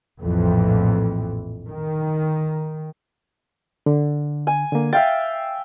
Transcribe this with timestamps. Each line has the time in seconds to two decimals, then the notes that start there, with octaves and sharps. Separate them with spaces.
0.21 A#1 F2 A2 E3
1.69 D#3
3.86 D3
4.47 G#5
4.72 D3 A#3
4.93 E5 F5 G5 A6